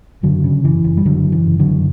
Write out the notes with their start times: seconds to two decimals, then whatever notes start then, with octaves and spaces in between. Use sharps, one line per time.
0.23 F#1 D3 F#3
0.44 C#3
0.64 F#1 E3
0.84 F#1
0.97 G3
1.05 F#1 D3 F#3
1.25 F#2
1.32 E3
1.46 F#1
1.59 D3 F#3
1.66 F#1